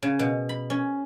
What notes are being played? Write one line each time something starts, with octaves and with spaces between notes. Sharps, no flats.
C#3
B2
B5
C#4